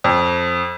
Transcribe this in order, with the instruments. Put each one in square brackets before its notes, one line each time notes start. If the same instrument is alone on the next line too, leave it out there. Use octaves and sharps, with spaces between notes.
[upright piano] F2